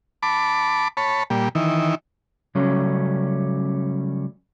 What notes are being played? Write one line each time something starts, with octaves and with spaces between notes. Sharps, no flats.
A5 B5 D6
C#5 A5 B5
A#2 G3
D#3 E3
C#3 F#3 G3 A3 C#4